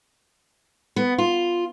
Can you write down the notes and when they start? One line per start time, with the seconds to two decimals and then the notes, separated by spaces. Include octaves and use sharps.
0.96 B3
1.18 F4